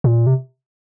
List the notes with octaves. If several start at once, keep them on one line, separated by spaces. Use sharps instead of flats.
A#2
C3